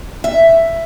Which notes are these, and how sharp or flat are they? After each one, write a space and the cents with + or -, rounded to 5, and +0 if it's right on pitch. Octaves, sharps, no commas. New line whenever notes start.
E5 +5